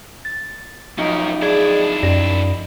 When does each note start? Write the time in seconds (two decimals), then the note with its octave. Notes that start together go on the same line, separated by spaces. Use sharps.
0.25 A6
0.98 F3 F#3 C#4 D#4 A#4
1.42 D4 E4 G#4 D5 G#6
2.03 F#2 G4 D5 A#6